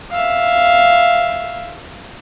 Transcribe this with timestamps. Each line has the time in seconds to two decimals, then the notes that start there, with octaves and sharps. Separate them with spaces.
0.12 E5 F5